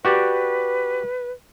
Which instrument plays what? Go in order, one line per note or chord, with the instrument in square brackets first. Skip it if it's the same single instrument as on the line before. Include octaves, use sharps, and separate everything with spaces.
[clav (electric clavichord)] F#4 G4 D5 [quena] B4